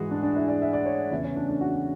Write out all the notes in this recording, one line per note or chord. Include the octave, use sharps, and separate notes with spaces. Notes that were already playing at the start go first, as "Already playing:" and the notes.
Already playing: G#2 E3 F#4 G#4
D4
D4
E4
D5
E5
D5
C#5
E2 C#3 E3 E4
C#4
D4
D4
F#4